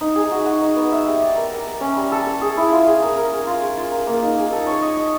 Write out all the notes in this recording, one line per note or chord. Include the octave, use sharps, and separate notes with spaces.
D#4
G#4
F#4
F#4
D#4
B3
E5
G4
D5
A#4
A#4
A#4
C#4
G3
A4
A4
G#4
E4
F4
G#4
A#4
A#4
G#4
F4
G#4
F4
A#4
A#3
D#4
G#4
A4
C#5
D#5
D#5